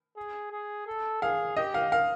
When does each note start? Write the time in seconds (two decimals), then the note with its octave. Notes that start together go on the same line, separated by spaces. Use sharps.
0.16 G#4
0.52 G#4
0.87 A4
1.22 G#4 F5
1.56 G4 D#5
1.74 F5
1.92 F5